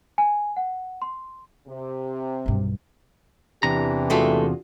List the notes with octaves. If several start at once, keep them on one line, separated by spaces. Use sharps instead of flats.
G#5
F#5
C6
C3
B1 G2
E2 C3 E3 D4 G4 A#5
G#3 A3 F4 F#4 G#4 A4